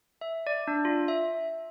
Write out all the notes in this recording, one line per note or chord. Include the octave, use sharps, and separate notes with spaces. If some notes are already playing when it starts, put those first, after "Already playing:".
E5
D5
D4
F4
E5